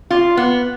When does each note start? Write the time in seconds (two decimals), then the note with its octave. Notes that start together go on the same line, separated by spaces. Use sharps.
0.10 F4
0.37 B3